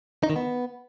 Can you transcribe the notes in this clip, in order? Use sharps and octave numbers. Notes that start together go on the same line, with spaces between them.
D#4
D#3
B3